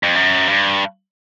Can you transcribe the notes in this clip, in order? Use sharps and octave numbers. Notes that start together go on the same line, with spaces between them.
F2
F#2
G2